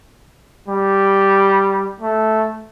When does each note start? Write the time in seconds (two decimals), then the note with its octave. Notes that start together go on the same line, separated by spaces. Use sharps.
0.68 G3
2.00 A3